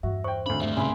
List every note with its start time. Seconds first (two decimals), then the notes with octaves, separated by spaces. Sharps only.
0.03 E2 G2 F#4 E5
0.24 C5 G5 C#6
0.46 G#1 D2 B5
0.62 G3 A3 E5
0.77 C2 G2 C#3 G#5 B5 C6